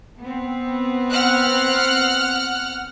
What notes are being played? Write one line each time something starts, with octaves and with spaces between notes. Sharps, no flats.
B3 C4
F#5 F6 F#6